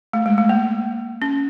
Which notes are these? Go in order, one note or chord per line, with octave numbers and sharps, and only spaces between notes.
A3
G#3
A3
A#3
C#4